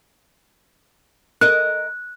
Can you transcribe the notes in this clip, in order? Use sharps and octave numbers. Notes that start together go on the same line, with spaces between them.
A#4 D#5 F#6